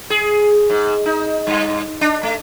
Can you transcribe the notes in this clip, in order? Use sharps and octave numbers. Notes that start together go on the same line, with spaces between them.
G#4
G#2
D#4
G2
D4
A3